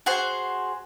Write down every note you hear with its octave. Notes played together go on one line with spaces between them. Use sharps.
F#4 G#4 C5